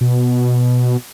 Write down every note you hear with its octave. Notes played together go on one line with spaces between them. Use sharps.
B2